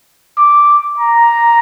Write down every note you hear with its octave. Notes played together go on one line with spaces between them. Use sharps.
D6
A#5